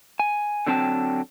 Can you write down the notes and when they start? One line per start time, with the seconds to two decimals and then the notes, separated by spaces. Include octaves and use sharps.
0.20 G#5
0.67 D3 F#3 C4 G5 A5